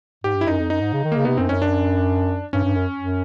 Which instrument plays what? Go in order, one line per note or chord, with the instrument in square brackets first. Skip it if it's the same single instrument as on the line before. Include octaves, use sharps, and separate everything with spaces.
[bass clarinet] G#2 [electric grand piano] G4
[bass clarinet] G2
[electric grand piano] E4
[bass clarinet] F#2 [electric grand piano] D#4
[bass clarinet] F2
[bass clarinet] F#2 [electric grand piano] D#4
[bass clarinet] G#2
C#3
D#3
[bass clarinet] C#3 [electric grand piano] A#3
[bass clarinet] C3 [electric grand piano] B3
[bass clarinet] F#2 [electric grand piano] C4
[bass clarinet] F#2 [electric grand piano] C#4
[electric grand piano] D4
[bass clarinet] G2 [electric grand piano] C#4
[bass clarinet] G2
F#2
F#2